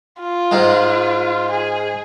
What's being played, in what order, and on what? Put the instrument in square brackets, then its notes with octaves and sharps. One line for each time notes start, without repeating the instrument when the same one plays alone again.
[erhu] F4
[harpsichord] G#2 G#3
[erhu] G#4